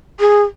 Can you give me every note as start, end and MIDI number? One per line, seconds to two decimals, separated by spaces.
0.20 0.43 68